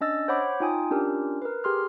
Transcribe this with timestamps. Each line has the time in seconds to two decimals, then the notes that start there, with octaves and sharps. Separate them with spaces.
0.01 C#4 D4 D#5 E6 A6
0.28 C5 C#5 F#5 B5 D6
0.60 D#4 F4 G5 G#5 D#6
0.91 C#4 D4 F4 G4 A#4
1.42 A#4 B4
1.64 G4 G#4 C6 F6